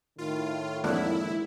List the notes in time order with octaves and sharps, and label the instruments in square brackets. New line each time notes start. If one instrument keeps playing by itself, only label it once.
[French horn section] A2 D#3 [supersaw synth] F4
[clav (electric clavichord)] F2 D4 F#5 [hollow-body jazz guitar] G#3 A#3 [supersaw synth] E4